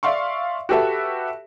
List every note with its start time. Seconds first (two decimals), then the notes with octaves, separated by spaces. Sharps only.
0.03 D5 E5 F5 C6 C#6
0.69 F#4 G4 A4 B4 E5